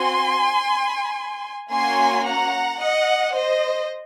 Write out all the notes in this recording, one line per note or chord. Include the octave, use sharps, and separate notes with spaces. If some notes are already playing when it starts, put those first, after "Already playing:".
Already playing: C4 F#4 G#5 C6
A#3 C#4 F#4 G#5 C6
F#5 A#5
D#5 F#5
C5 D#5